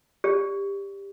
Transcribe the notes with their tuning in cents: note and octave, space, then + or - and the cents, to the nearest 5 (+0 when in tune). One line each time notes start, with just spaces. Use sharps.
G4 +15 D5 -20